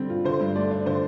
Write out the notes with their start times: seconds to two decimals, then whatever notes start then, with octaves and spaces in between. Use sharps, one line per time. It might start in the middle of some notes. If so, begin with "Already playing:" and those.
Already playing: D3 G3 C4
0.10 F4
0.24 D3 C5
0.41 G2
0.55 A3 D5
0.71 D4
0.86 D3 C5